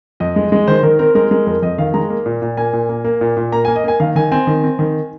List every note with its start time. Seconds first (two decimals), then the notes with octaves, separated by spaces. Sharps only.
0.20 F2 D#5
0.36 G#3
0.52 G#3
0.68 D#3 C5
0.83 D#3 A#4
0.99 C4 A#4
1.15 G#3 A#4
1.31 G#3 A#4
1.47 F2 A#4
1.62 F2 D#5
1.78 D#3 F5
1.94 G#3 A#5
2.10 A#3
2.26 A#2
2.42 A#2
2.57 A#3 G#5
2.73 A#2
2.89 A#3
3.04 A#3
3.21 A#2
3.37 A#2
3.52 A#3 A#5
3.65 A#3 G#5
3.76 D#5
3.84 A#3 G#5
4.00 D#3 F5
4.16 D#3 G#5
4.31 C4 G#5
4.47 D#3
4.64 C4
4.79 D#3